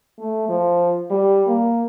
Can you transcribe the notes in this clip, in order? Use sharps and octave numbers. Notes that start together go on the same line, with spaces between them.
A3
F3
G3
A#3